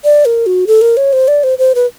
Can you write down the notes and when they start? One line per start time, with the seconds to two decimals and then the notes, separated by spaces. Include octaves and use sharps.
0.04 D5
0.25 A#4
0.46 F#4
0.67 A4
0.81 A#4
0.97 C#5
1.13 C5
1.28 D5
1.43 C5
1.58 C5
1.75 B4